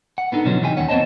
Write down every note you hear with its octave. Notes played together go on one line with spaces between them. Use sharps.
F#5
B3 D4 D#4 A4
B2 D3 F3 F#3 C#4
C3 E3 D#4 E4 G4 G#5
D#2 D#3 C#4 F#5
B3 C4 C5 C#5 D#5 A5